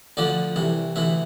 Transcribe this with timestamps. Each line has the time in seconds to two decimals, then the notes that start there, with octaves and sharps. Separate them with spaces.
0.17 D2 D3 F3 D5
0.56 C2 C3 E3
0.96 D2 C3 E3 E5